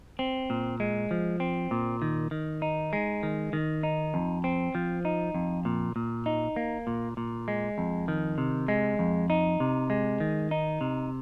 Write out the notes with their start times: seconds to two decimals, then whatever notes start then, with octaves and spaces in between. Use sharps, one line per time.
0.19 C4
0.50 A#2
0.80 G#3
1.11 F3
1.40 C4
1.71 A#2
2.02 D#3
2.31 D#3
2.62 D#4
2.93 G#3
3.23 D#3
3.53 D#3
3.83 D#4
4.14 F2
4.44 C4
4.75 F3
5.05 D#4
5.35 F2
5.65 A#2
5.96 A#2
6.26 D#4
6.56 A#3
6.87 A#2
7.17 A#2
7.48 G#3
7.78 F2
8.08 D#3
8.38 C3
8.68 G#3
8.99 F2
9.30 D#4
9.60 C3
9.90 G#3
10.20 D#3
10.51 D#4
10.81 C3